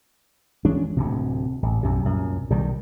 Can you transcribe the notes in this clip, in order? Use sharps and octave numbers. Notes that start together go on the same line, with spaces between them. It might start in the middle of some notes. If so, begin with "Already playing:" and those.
E3 G#3 C#4 D4
D1 D2 C3
A1
B1 F#2 C3
C2 F#2 A#2
B1 C3 D#3 G3